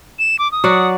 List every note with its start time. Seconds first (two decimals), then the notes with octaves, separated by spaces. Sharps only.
0.19 E7
0.39 D6
0.52 D#6
0.64 F#3 D5 F#5